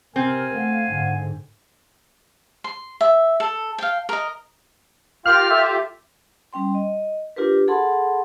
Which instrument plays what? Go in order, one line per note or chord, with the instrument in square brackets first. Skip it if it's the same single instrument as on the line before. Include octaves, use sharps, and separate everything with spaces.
[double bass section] C3 [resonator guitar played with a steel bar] C4 [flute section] A#4 [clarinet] G#5
[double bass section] A3 [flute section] F5 F#5
[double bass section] G#2 D3
[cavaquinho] C6
E5
A4
F5 G5
A#4 D#5
[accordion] F4 G4 [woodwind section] A#4 F5 G5 [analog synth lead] F6
[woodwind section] A4 E5
[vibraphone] G3 C#4 G5 C6
D#5
D4 F4 G4 A#4 B4
G#4 A4 F#5 A5 B5 C6